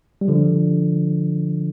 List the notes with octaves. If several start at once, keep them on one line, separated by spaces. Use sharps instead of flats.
G3
D3 F3